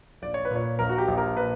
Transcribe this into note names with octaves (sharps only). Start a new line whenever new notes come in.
A#1 D5
C#5
B4
A#2 C#5
A#1 A#4
F#4
G4
A#1
A#4
A#2 B4